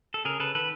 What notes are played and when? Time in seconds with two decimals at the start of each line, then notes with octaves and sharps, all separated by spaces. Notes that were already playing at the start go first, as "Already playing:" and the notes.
0.14 A4
0.25 C#3 G#4 A#4
0.40 C#3 A4 B4
0.55 D#3 A4 B4